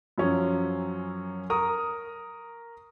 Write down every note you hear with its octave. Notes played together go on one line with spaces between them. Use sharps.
F#2 F3 F#3 C#4
A#4 C#6 D#6